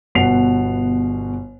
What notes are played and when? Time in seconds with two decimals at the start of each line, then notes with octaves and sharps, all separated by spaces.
0.15 G1 B2 F#5 C7 F7